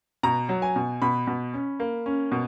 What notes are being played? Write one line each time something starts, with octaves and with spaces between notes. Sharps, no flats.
B2 A#5
F#3
G#5
B2
B2 B5
B2
C#4
A#3
C#4
B2